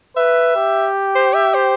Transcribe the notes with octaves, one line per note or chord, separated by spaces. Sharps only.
B4 E5
G4
C5
E5
C5